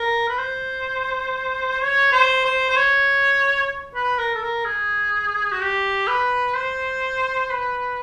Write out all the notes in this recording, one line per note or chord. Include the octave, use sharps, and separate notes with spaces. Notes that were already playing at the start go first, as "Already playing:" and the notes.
Already playing: A#4
B4
C5
C#5
C5
C5
C5
C#5
B4
A#4
A4
A#4
G#4
F#4
G4
B4
C5
B4